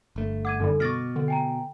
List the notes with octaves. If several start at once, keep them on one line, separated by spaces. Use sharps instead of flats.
G1 A3
F#5 D6 G#6 D#7
F#2 D3 G3 D#4 A4
B2 C#6 D6 F6 A6 A#6
D3
G5 G#5 A#5